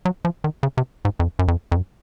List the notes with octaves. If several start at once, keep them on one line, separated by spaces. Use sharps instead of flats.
F#3
F3
D#3
C#3
C3
G#2
F2
F#2
F2
F2
F#2